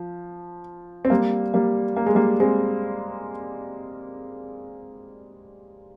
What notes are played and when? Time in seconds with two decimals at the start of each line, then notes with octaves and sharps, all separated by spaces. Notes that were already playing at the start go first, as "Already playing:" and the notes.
Already playing: F3
1.05 C4
1.10 G3 A#3
1.54 G3 A#3
1.97 A#3
2.06 G#3
2.15 G3 A#3
2.40 G#3 C4